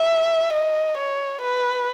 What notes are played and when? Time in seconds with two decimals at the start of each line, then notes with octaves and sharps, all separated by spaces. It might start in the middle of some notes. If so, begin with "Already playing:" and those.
Already playing: E5
0.53 D#5
0.98 C#5
1.42 B4